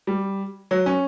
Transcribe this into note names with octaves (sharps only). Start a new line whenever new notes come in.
G3
F#3
C#4